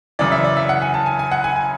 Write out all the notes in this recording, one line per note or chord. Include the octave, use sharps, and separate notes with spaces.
F#2 C#3 E3 D5
E5
D5
E5
F#5
G#5
A5
G#5
G#5
F#5
G#5
G#5